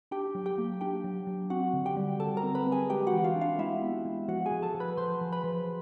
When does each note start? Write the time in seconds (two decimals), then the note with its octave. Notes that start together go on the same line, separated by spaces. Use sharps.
0.11 D4 G4 G5
0.35 F#3
0.46 G4 G5
0.58 A#3
0.81 D4 G4 G5
1.04 F#3
1.27 F#3
1.50 C4 F#4 F#5
1.73 D3
1.86 G4 G5
1.97 G3
2.19 D3 A4 A5
2.37 A#4 A#5
2.43 C4
2.55 B4 B5
2.66 C4
2.72 G#4 G#5
2.89 G#3 G4 G5
3.07 F#4 F#5
3.13 E3
3.24 F4 F5
3.36 D4
3.41 F4 F5
3.58 G#3 E4 E5
3.81 B3
4.05 G#3
4.28 F3 F#4 F#5
4.46 G#4 G#5
4.51 F3
4.62 A4 A5
4.75 F3
4.80 B4 B5
4.97 F3 C5 C6
5.21 F3
5.32 B4 B5
5.44 F3